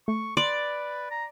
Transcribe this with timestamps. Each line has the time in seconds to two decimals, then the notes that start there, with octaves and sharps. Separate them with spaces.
0.08 A3 C#6
0.37 B4 D5 C6
1.11 A#5